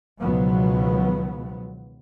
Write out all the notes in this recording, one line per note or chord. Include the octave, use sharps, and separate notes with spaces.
C#2 B2 D#3 F3 F#3 B3